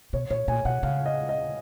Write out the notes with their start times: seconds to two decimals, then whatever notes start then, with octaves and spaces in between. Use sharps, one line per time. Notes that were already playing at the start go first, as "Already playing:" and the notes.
0.13 B2 C#5
0.30 A#2 C#5
0.48 A#2 G#5
0.65 B2 F#5
0.83 C#3 F5
1.06 D#5
1.29 D#5